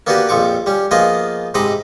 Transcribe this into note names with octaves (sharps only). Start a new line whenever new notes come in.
A#3 B3 D4 F#4 G4 B4
A#1 F2 F3 C#6 D6
G3 C#4
F3 A#3 B3 G#4 D#5
G#2 C3 D#5 B5 D6